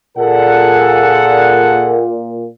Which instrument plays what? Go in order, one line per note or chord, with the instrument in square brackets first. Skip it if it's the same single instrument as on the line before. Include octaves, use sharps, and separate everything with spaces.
[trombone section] A#2 [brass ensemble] G#4 A4 F#5